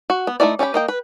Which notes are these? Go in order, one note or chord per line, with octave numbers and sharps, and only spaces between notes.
F#4
B3
A3 A#3 D#4 E4 D5
C#4 G4 D5 B5
A#3 D#5 G5
B4